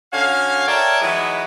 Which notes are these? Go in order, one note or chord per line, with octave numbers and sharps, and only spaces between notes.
D3 C#4 F#4 F5
A#4 C#5 D5 E5 G5 A5
E3 F#3 G#3 D#4 E4